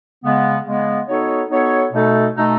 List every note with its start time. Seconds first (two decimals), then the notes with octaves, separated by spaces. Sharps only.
0.24 C#3 G#3 B3
0.66 C#3 G#3 B3
1.08 B3 D#4 F#4 A4 C#5
1.51 B3 D#4 F#4 A4 C#5
1.93 B2 A3 D#4 A4
2.35 B2 A3 D#4 A4